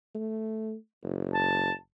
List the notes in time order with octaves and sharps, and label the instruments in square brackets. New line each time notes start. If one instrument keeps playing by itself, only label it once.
[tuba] A3
F#1
[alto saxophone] A5